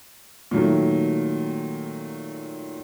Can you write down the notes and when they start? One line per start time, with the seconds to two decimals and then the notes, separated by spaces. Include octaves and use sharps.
0.51 A#2 D#3 F#3 A3